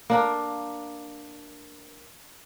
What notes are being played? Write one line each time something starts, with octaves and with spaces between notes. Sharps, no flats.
A#3 D4 A#4